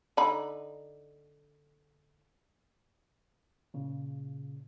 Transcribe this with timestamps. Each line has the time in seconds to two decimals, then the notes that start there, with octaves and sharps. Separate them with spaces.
0.17 D3 D#4 B5
3.74 A#2 C#3